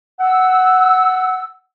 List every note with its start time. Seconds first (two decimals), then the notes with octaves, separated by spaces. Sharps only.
0.20 F#5 E6